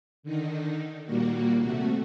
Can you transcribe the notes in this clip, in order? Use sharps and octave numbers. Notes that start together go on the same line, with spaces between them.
D3 D#3 D#4
D#2 A#2 G3 A#3 F#4
C3 A3 F#4